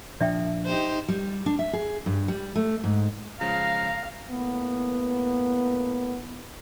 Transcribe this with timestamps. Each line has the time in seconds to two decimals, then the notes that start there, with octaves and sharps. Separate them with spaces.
0.21 A#2 F3 D4 D5 E5 G5
0.66 D#4 G4 C5
1.08 G3
1.46 D4
1.59 E5
1.73 G#4
2.06 G2
2.28 G3
2.55 A3
2.84 G#2
3.41 C#3 F3 G#3 F5 A#5
4.30 A2 A#3 B3